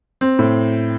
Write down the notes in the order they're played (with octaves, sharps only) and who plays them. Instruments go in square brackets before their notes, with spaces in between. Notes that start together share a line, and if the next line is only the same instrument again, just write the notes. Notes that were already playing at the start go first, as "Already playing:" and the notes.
[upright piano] C4
A2